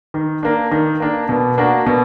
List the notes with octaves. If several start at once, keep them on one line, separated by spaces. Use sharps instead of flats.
D#3
A#3 D4
D#3
A#3 D4
B2
A#3 D4 F#4
B2